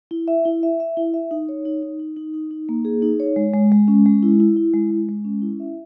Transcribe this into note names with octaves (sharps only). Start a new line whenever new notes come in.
E4
E5
E4
E5
E5
E4
E5
D#4
C#5
D#4
D#4
D#4
D#4
D#4
D#4
A#3
G#4
D#4
C#5
G#3
G#3
G#3
C#4
G#3
E4
E4
E4
G#3
G#3
G#3
C#4
E4
E5